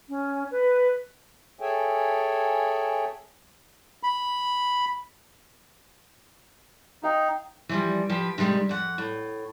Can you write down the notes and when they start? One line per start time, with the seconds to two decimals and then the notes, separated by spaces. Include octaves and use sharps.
0.09 C#4
0.51 B4
1.60 G#4 A4 C#5 E5 G5 G#5
4.03 B5
7.03 D#4 F5 G5
7.69 E3 F3 G3
8.10 F3 G4 B4
8.38 C3 D#3 G3 G#3
8.69 F2 F#5
8.98 A2